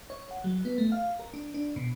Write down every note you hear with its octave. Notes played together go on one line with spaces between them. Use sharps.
C#5
F#5
F#3
B3
A3
F5
A#4
D4
D4
B2